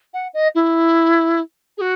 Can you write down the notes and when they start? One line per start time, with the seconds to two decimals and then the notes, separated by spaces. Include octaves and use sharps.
0.13 F#5
0.33 D#5
0.54 E4
1.77 G#4
1.81 F#4